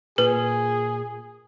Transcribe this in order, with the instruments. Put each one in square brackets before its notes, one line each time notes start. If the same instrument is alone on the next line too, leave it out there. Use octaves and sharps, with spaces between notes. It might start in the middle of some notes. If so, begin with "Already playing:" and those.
[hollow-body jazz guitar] A#2 [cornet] G#4 [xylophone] B4